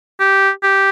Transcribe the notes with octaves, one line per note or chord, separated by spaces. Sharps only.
G4
G4